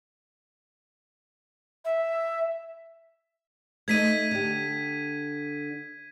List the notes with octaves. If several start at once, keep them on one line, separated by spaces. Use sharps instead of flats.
E5
A3 D#4 D#5 G#6 B6 D#7
D3 G4